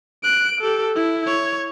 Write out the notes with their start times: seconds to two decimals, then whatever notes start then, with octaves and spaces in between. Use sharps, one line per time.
0.23 F#6 D7
0.61 G4 A4
0.96 E4
1.27 C#5